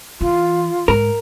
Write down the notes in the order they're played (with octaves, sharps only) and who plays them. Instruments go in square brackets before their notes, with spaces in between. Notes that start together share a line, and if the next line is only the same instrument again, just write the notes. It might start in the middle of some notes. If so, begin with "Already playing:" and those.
[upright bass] E3 [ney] F4
[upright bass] G#2 [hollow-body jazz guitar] A#4